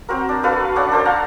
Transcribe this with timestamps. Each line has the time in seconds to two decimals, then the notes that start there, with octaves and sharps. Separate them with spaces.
0.09 C4 F#4 A#4
0.29 D4
0.43 F#4 A4 B4 F5
0.76 C#4 D4 F#5 A5
0.91 A4 C5 D5
1.05 F5 F#5 A5 A#5